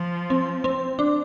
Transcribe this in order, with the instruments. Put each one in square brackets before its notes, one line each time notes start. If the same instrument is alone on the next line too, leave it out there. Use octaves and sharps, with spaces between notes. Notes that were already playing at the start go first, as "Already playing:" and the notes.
Already playing: [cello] F3
[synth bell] C4
C4
D4